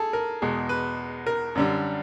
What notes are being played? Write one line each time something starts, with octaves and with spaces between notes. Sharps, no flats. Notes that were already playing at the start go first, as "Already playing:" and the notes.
Already playing: G#4 A4
A#4
E2 B2 G#3
B4
A#4
F#2 D3 G3